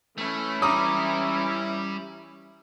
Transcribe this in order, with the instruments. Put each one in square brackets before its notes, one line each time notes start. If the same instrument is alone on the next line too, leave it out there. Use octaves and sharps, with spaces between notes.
[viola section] E3 C#4 E4 [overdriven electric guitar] A3
[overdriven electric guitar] G3 [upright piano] A#5 D6 D#6